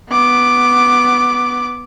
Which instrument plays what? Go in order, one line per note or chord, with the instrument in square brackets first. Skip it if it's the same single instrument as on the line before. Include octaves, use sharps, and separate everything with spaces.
[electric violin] B3 D6